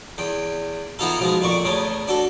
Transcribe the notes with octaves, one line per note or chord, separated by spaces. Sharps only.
E2 G5
E3 B3 D#4 F4 A4
B2 F3 G#3
F2 A#2 D5 C#6 D6
E2 C#3 A3
D4 F#4 A4